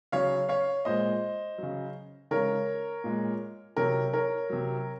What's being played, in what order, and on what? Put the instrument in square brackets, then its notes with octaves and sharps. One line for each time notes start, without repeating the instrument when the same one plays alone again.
[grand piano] C#3 F#3 C#5 F5
C#5 F5
A#2 G#3 C5 D#5
C#3 F#3
C#3 G#3 A#4 C#5
A#2 G#3
C3 F#3 A#4 C#5
A#4 C#5
C3 F#3